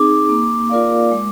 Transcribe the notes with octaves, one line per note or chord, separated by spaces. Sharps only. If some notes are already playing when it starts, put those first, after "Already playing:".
Already playing: C4 D#4 G#4 D6
A#3
F4 A#4 D5 F5
G#3